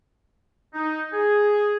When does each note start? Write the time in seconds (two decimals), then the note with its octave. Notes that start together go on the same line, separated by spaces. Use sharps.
0.73 D#4
1.12 G#4